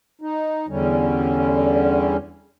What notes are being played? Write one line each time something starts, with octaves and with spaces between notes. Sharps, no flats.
D#4
E2 D3 G3 C#4